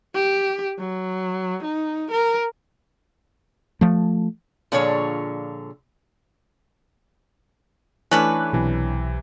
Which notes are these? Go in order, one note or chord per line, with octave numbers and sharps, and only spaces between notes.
G4
F#3
D#4
A#4
F3 A3
A#2 D3 F3 G#4 C#5
E3 A3 C#4 D4 B4 F#6
B1 C3 E3